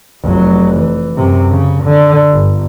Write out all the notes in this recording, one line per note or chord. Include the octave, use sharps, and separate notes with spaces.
F1 F#3
E3
F#2 C3
C#3
D3
G1